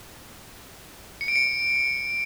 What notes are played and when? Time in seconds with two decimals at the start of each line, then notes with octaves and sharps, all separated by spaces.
1.21 C#7
1.28 D7
1.36 C#7